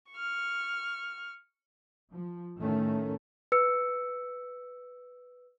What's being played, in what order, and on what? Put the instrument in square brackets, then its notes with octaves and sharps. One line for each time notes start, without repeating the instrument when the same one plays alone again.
[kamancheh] C#6 F6
[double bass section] F3
A2 D#3 A3 C#4
[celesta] B4 E6 C#7